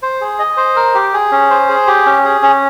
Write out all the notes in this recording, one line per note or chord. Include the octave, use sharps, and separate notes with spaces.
C5
G#4
D#5
C5
A#4
G4
G#4
C#4
C5
G#4
G4
C#4
G#4
C#4